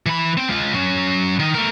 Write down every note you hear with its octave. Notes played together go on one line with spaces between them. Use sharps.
E3 B5
C4 G5
G#3 F4
F#3 C#4
D#3 D#5
A3 A#4